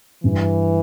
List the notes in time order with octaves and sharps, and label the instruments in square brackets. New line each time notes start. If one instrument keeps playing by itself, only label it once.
[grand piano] G2 [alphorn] E3